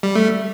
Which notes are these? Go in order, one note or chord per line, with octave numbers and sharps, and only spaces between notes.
G3
A3